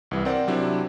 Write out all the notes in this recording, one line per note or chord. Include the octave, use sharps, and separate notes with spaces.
C2 E3 G3
C4 A#4 C5 D5 F#5
C3 F#3 C4 D4 E4